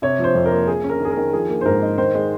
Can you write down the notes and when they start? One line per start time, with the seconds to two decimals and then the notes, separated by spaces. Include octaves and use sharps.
0.02 C3 C#5
0.19 F3 C5
0.35 F2
0.46 A#4
0.52 A#3
0.68 A#3 G#4
0.84 C#4
0.90 A#4
1.00 D#3
1.05 G#4
1.11 A#4
1.17 D#3
1.33 F3 G#4
1.49 A#3
1.61 C5
1.65 G#2 A#4
1.82 D#4
1.98 D#3 C5
2.15 G#3